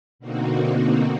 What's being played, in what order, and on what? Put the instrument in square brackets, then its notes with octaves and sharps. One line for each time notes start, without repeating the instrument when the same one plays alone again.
[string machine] B2 D3 A#3 C4 D#4 F#4